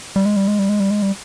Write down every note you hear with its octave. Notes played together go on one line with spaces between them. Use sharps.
G3
G#3
G3
G#3
G3
G#3
G3
G#3
G3